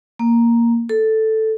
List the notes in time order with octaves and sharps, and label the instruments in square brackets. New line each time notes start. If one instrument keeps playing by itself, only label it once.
[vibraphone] A#3
A4